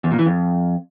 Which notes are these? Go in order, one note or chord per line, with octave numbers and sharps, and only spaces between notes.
E2
A#2
E3
F2